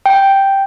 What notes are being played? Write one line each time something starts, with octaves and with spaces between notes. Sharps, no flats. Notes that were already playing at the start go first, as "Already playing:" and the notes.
G5